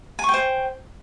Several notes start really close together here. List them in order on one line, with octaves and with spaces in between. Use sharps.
G#5 C#6 G5 C5